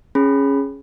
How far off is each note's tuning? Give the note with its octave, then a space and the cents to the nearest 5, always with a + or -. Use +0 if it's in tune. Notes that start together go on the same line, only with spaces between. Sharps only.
C#4 -5 G#4 +0 B5 +0